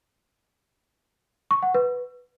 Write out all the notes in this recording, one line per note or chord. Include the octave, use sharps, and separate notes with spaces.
C#6
F#5
B4